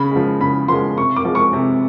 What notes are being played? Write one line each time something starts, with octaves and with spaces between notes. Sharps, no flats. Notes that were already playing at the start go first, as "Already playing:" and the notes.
Already playing: C#3 B5
F3 G#3
C#3 B5
F3 G#3 C6
C3 C#6
D6
F3 G#3
C#6
C3